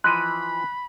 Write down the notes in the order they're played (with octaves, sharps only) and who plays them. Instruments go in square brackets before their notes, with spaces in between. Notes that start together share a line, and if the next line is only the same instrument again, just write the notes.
[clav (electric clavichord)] E3 F3 D#5 [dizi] B5 [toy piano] C6 [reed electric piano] F#6